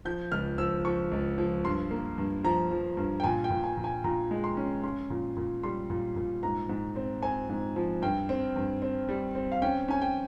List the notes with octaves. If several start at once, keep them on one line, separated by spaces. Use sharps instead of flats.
F3 G6
C#2 F6
F3 E6
F3 C#6
C#2
F3
G2 C6
A#3
G2
F3 A#5
F3
G2
G5
A#2 G#5
G5
A#2
G#5
A#2
G#5
A#2 A#5
G#3
C6
C#4
C#4 C6
A#2
A#2
G3 C6
A#2
A#2
G#2 A#5
G#2
C4
C4 G#5
G#2
F3
G2 G5
C4
G2
C4
G3
C4
F5
C#4 G5
C#4 G#5
G5